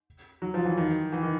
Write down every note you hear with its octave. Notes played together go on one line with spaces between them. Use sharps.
F#3
F3
E3
D#3
E3
D#3